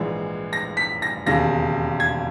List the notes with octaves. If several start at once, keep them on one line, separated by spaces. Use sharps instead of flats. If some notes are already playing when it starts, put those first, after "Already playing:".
Already playing: A#1 G#2 E3 G#3
A#6
B6
A#6
E1 D#2 C#3 A#6
G#6